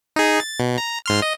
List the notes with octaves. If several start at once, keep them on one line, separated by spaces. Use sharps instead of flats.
D#4 G#4
A6
B2
A#5
G#2 C6 F6
D#5